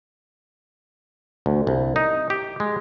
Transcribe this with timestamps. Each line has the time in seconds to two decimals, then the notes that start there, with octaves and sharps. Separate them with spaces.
1.46 D2
1.67 C2
1.96 D#4
2.30 G4
2.60 G#3